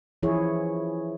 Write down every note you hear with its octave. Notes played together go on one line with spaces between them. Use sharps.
E3 F3 E4 G#4 C#5